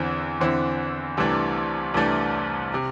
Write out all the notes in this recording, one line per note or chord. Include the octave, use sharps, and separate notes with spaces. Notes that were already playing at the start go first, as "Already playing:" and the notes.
Already playing: E2 D3 C4 E4
E2 D3 C4 E4
C2 C3 E3 A3 D4
C2 C3 E3 A3 D4
C3